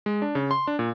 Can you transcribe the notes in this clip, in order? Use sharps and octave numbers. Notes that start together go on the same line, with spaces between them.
G#3
D4
C#3
C6
D4
A#2